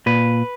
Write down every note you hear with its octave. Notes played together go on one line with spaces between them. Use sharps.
A#2 B4